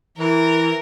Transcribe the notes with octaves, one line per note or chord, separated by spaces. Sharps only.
E3 A#4